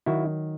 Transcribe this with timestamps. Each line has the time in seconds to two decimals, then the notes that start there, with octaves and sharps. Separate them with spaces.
0.06 D#3 F#3 E4 F#4